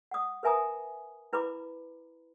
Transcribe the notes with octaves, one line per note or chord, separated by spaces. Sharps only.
F#5 D#6
A#4 B4 E5 G#5 A#5 D#6
E4 B4 A#5 B5 D6